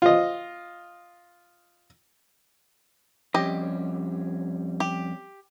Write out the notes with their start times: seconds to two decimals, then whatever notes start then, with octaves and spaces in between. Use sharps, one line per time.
0.02 F4 D#5
3.34 F2 G3 C#4 G4 D#5
4.80 G4